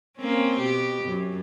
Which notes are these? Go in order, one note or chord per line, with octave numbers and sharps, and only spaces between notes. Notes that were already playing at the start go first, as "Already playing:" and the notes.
A#3 C4 C#4
B2 G4
F#2